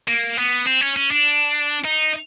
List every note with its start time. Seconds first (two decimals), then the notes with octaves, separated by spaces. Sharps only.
0.08 A#3
0.37 B3
0.66 C4
0.81 C#4
0.96 C#4
1.11 D4
1.85 D#4